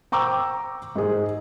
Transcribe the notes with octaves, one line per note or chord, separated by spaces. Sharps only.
G5 A#5 C#6 D6 E6
G#2 G#4